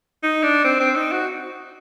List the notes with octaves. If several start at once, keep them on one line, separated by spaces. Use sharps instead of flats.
D#4
D4
C4
C4
D#4
F#4